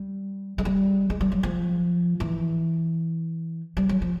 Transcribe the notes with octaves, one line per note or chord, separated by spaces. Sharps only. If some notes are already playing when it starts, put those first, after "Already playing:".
Already playing: G3
G#3
G3
G#3
G3
F#3
F3
E3
G3
F#3
F3